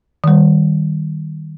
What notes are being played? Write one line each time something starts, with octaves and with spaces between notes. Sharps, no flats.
D#3 G3